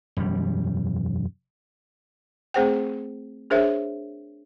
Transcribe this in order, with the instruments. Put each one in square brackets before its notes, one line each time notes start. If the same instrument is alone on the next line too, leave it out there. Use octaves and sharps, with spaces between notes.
[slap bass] E1 F#2 G3
[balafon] A3 C4 G#4 C5 F#5 G5
D4 G#4 A#4 C5 C#5 E5